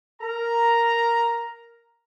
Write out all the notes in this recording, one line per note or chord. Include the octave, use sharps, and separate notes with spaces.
A#4 A#5